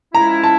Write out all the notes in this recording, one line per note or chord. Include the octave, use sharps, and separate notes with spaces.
F3 G#3 C#4 E4 A#5
A5